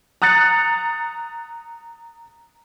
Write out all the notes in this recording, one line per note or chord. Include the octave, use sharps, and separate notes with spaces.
A#5 D#6 F#6 A6 C#7